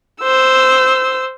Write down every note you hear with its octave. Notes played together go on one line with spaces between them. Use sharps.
C5 E6